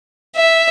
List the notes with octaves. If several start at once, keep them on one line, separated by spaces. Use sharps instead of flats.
E5